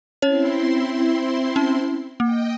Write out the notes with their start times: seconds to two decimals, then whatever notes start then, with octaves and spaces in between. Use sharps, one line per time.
0.22 C4 C#4 E4 C#5 C6
1.56 C#4
2.20 A#3 D#5 G5